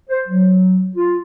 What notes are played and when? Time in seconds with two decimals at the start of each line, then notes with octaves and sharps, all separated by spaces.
0.10 C5
0.28 F#3
0.96 F4